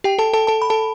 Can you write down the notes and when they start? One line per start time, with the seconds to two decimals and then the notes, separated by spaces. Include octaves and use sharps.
0.04 G4 G5
0.18 A4 A5
0.33 A4 A5
0.47 A4 A5
0.62 B5
0.70 A4 A5